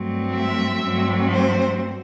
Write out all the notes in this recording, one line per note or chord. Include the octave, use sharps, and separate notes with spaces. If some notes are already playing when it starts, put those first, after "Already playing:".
Already playing: G2 F#3 A3 C4
E5
G2 F#3 A3 C4
C5